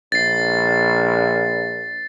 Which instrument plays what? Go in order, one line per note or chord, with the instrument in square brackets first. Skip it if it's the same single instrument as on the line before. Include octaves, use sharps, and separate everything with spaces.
[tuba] A#1 [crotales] A6 C7